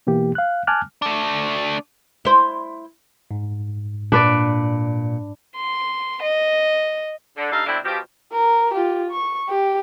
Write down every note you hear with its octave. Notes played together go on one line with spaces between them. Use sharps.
B2 E3 A#3 G4
F5 F#6
G#5 A5 D6 F6 F#6
A3 D4
E4 C5
G#2
A#2 D4 B4 D5
C6
D#5
D3
G2 D#4 A4 F5
B2 D3 A3 C4 D4 E4
B2 F3 G4
A#4
F4 G4
C#6
G4